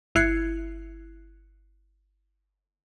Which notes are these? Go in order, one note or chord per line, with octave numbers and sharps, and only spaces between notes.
G1 E4 F#6 G#6 C7 C#7